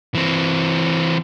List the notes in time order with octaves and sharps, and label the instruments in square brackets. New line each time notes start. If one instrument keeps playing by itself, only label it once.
[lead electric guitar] E3 C4